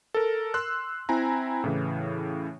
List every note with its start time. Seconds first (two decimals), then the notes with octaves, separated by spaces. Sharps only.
0.14 A4 A#4
0.54 C6 E6 F#6
1.09 C4 E4 G#5 A#5
1.64 A2 C#3 E3